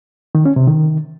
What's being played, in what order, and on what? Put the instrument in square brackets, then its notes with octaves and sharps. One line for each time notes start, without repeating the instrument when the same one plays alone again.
[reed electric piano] D#3
C#4
C3
D#3